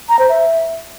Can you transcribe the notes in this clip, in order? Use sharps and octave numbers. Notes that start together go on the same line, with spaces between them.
A#5
C5
E5